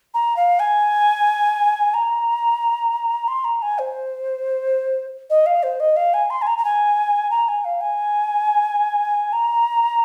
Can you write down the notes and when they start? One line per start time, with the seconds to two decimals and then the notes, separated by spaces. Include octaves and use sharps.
0.14 A#5
0.36 F5
0.59 G#5
1.94 A#5
3.28 C6
3.44 A#5
3.62 G#5
3.79 C5
5.30 D#5
5.46 F5
5.63 C5
5.80 D#5
5.96 F5
6.14 G#5
6.30 C6
6.42 G#5
6.47 A#5
6.58 A#5
6.64 G#5
7.31 A#5
7.48 G#5
7.65 F5
7.81 G#5
9.33 A#5